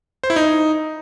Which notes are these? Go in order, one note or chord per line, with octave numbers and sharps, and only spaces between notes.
C5
E4
D#4